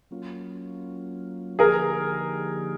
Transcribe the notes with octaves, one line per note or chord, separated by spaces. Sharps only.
F#3 A#3 C#4 F4
D3 F3 A#3 D#4 G4 G#4 A#4